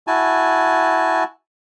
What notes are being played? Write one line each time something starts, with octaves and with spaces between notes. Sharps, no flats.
E4 F#4 G#5 A5